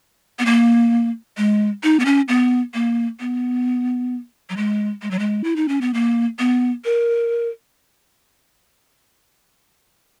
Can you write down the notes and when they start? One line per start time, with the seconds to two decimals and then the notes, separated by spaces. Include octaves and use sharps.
0.39 B3
0.46 A#3
1.37 G#3
1.83 D#4
2.00 B3
2.05 C#4
2.28 B3
2.74 A#3
3.20 B3
4.50 F#3
4.57 G#3
5.02 G#3
5.11 F#3
5.19 G#3
5.44 E4
5.56 D#4
5.68 C#4
5.81 B3
5.94 A#3
6.39 B3
6.85 A#4